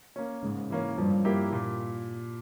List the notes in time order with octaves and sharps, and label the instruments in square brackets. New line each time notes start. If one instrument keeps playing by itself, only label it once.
[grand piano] A#3 C#4
[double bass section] G#2 [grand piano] C#3
[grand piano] E3 A#3 C#4
[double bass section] G2 [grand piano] F3
[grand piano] A#3 E4 G4 A#4
A#2